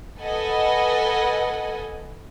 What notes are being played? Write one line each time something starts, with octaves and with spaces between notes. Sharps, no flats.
A4 B4 D#5 F#5 G#5